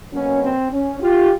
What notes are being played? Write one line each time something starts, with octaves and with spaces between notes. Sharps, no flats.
B2 F#3 A#3 C#4
C4
C#4
F4 G4